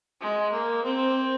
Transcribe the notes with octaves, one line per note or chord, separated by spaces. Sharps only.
G#3
A#3
C4